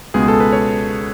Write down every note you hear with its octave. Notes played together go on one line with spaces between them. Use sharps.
C#2 B2 G#3 B3 G#4
A4
B4
C#5